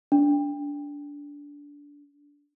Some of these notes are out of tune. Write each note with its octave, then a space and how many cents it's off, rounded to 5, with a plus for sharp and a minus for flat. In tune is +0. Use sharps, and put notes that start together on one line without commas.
D4 -20